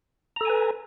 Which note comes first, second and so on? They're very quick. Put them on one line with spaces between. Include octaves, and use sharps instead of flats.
A#5 A4 G#5 B4